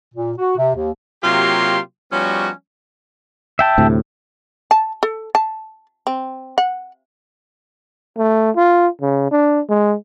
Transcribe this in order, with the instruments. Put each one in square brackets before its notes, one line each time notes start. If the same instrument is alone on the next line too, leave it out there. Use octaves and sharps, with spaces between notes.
[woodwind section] A#2
F#4
C3
D#2
[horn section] C3 F#3 A#3 F4 G4 C6
F3 G3 B3 C#4 D#4 F#4
[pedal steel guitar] E5 G5 A5
[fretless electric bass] D2 A2 C3
[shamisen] A5
A4
A5
C4
F#5
[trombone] A3
F4
C#3
D4
G#3